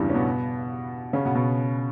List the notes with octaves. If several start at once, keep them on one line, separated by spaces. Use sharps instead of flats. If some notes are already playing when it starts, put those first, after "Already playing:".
Already playing: E2 G2 C#3 E3 G3
C#4
B2 B3
C#3 C#4
B2 B3
B2 B3